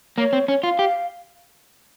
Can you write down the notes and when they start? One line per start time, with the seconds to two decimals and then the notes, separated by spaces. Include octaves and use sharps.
0.18 A#3 C#5
0.33 C4
0.48 C#4 C#5
0.63 F4 F5
0.79 G4